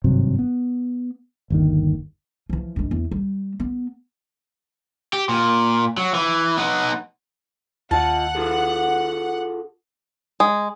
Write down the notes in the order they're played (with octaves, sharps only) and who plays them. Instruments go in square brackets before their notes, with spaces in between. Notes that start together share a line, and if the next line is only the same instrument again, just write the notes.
[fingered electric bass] G#1 G2 C3 F#3
B3
G1 D#2 D#3
[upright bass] E3 F3
G2 G#3
E2
G3
B3
[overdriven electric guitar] G4
A#2
F#3
E3
B3 D#4
[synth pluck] D#2 [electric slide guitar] F4 D#5 [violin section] F#5 [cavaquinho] A5
[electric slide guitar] F4 G#4 A4
[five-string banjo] G#3